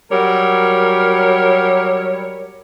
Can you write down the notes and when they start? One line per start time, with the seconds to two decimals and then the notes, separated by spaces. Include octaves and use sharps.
0.11 F#3 G3 A#4 C#5